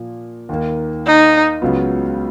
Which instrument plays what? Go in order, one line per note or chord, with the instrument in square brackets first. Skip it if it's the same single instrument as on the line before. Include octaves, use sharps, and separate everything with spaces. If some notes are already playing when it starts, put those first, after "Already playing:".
Already playing: [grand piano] A#2 F3 A#3
D#2 D#3 A#3
[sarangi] D#4
[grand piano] C#2 C#3 F#3 B3 F4